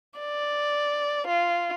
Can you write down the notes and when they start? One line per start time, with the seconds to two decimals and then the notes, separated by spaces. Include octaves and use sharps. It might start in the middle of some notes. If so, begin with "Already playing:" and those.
0.20 D5
1.27 F4